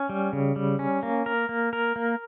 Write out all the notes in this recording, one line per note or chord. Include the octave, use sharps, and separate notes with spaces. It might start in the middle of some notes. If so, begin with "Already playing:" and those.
Already playing: C#4
G3
C#3
G3
C#4
A#3
A#4
A#3
A#4
A#3